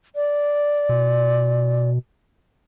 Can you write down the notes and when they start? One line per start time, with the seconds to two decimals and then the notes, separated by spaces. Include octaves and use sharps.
0.16 D5
0.89 B2